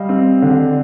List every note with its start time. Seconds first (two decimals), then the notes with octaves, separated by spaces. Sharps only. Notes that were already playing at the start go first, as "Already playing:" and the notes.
Already playing: G3 D#5 F5
0.09 C4
0.42 D3